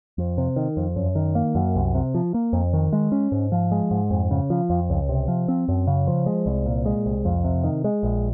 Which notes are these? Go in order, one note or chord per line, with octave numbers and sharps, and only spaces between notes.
F2
C3
D#3
F2
F#2
D#3
A#3
F#2
C2
C3
F3
A#3
F2
D#3
G#3
C#4
G#2
F3
G#3
G#2
F2
C#3
F3
F2
C#2
C3
F3
C4
F#2
C#3
F3
G#3
C2
A#2
G#3
C2
F2
C3
D#3
G#3
A#1